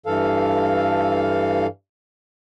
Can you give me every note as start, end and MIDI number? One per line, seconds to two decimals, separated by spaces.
0.06 1.67 43
0.06 1.67 52
0.06 1.67 69
0.06 1.67 77